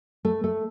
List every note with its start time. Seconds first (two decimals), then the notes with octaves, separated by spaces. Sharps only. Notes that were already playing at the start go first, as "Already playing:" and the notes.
0.25 A3
0.44 A3